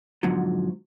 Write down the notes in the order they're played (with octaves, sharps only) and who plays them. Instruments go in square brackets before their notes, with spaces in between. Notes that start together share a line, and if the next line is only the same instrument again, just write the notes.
[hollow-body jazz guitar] G#2 B2 D3 F3 F#3